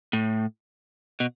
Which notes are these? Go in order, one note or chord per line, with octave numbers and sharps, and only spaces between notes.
A2
B2